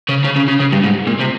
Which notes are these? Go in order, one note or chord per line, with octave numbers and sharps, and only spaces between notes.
C#3
C#3
C#3
C#3
C#3
G2
G#2
A#2
C3